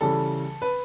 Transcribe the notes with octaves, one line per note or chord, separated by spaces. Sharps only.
C#3 E3 G3 A4
B4